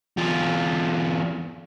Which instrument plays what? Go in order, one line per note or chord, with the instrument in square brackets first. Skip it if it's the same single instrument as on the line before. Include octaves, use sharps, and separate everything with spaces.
[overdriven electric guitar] E2 F4